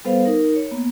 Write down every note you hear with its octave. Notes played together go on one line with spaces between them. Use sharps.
G3 B3 A4 B4 C5 F5
D#4 A#4
C#5
A#3 B3